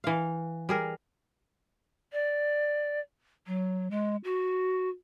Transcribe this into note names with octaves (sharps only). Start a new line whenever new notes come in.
E3 F5
G3 G#4 A#4
D5
F#3
G#3
F#4